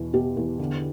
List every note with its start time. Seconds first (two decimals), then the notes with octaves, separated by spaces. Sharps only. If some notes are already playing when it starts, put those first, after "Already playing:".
Already playing: E2 B2
0.14 B2 G4
0.37 E2
0.59 D3